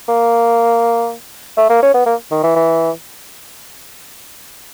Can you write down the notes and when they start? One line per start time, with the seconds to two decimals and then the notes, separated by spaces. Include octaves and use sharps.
0.09 A#3
1.58 A3
1.70 A#3
1.82 C#4
1.94 B3
2.06 A#3
2.31 D#3
2.43 E3
2.56 E3